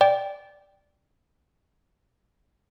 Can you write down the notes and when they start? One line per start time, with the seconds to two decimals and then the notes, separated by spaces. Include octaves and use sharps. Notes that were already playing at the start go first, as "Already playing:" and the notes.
0.01 D5 G5